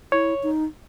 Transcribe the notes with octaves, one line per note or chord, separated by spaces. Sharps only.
E4 C#5
D#4